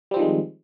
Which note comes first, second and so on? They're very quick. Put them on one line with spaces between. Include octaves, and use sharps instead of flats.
G3 C4 F3 D#3 G#3